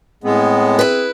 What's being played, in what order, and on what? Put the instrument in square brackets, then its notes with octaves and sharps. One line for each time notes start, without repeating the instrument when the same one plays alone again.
[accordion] A2 G#3 B3 [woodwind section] C4 G#4
[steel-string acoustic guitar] E4 B4